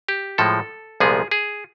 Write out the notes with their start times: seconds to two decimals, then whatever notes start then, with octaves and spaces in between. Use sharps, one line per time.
0.09 G4
0.38 A2 F3 G#3 A4
1.00 C2 A#2 F3 G#3 B3 G#4
1.31 G#4